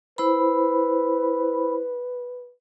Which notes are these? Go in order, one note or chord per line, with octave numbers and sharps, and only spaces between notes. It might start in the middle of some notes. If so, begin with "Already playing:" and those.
E4 B4 C5 B5